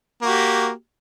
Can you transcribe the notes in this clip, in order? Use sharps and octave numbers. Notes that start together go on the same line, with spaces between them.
A#3 F#4 G4